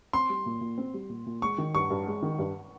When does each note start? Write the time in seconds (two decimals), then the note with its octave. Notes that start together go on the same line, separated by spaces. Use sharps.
0.13 C4 C6
0.29 G3
0.46 A#2
0.61 A#2
0.78 C4
0.94 G3
1.09 A#2
1.26 A#2
1.42 G#3 C#6
1.58 D#3
1.75 G2 C#6
1.90 G2
2.06 G#3
2.22 D#3
2.39 G2